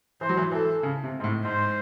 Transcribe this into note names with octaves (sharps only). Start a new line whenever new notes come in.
E3 C5
F#3
E3
E3 A4
C#3
C3
G#2
A2
G#2 C5